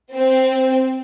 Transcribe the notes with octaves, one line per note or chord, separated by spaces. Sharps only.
C4